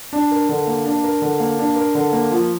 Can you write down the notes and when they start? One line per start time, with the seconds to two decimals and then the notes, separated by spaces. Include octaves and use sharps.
0.13 D4
0.31 A#4
0.49 D3
0.67 A#3
0.86 D4
1.04 A#4
1.22 D3
1.40 A#3
1.59 D4
1.76 A#4
1.95 D3
2.13 A#3
2.31 F3